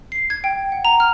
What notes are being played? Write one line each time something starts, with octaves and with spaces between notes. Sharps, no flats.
C7
G#6
G5
F#5
A#5
F6